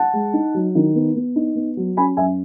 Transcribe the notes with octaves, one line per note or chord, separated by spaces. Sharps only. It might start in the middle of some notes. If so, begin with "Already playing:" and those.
Already playing: F#5 A5
G#3
D#4
F#3
D#3
B3
B3
D#4
B3
F#3
C#4 G#5 B5
F#2 E5 G#5